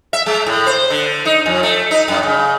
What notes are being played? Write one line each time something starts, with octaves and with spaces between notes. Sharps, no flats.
E5
G#3
A2
C5
D3
D#4
F2
A3
D#4
F#2
C#3